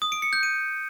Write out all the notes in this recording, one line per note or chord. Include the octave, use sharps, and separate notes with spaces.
D#6
D7
C#7
G6
D#7